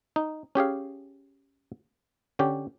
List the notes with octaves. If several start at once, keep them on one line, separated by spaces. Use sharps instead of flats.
D#4
C#4 G4 G#4 F5
D3 C#4 G4